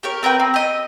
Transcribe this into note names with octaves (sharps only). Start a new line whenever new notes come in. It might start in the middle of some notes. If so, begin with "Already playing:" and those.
G4 A#4 C#5
C4 A#4 B4 G5
C4
G4 D#5